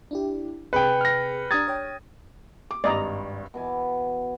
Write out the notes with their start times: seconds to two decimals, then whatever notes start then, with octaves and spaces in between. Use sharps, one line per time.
0.11 D4 E4 G4
0.73 C3 G#4 B4 G5 C#7
1.01 F6 A#6
1.51 D4 G4 A#5 D#6 G#6 A6
1.68 C#5 G5
2.71 D6
2.84 G#1 G2 D5 D#5 A#5
3.54 B2 E3 G#5 D6